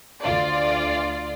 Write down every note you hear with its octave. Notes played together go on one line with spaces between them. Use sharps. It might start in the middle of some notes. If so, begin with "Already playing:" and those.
D2 F4 D5